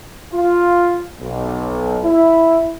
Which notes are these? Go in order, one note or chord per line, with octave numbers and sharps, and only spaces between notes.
F4
B1
E4